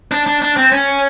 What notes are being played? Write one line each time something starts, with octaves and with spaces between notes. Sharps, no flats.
D4
D4
D4
C4
C#4